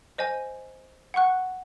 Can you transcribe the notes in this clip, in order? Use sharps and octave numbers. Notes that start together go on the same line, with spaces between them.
C5 D#5 G#5
F#5 C#6 F#6